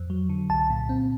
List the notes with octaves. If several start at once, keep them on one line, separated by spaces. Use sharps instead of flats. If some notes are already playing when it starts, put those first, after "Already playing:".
Already playing: F2
F#3
D3
C2 A5
A#2
C4